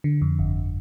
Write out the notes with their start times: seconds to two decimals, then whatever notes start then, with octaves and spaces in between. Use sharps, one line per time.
0.04 D3
0.21 F2
0.39 G1